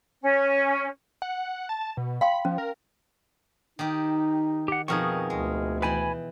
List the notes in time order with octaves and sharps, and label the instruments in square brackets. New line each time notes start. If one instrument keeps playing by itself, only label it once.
[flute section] C#4
[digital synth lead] F#5
A5
B2
[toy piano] F5 G5 C6 [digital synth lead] B5
[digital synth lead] F3 [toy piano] C#4
[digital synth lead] A#4
[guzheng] D#3 G4 [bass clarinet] D#4
[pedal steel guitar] G4 F#5
[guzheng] F2 B2 D#4 [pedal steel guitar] G#4 A#4 C#6
[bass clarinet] D2 [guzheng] G#3
[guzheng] E3 G5 [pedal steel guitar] B4 G#5 B5